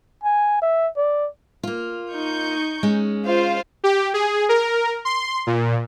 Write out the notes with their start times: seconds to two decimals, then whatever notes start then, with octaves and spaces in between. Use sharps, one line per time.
0.23 G#5
0.62 E5
0.97 D5
1.63 A#3 F4
2.13 D#4 C#6 G6
2.83 G#3 C#4
3.26 F4 C5 F5
3.84 G4
4.14 G#4
4.49 A#4
5.05 C6
5.47 A#2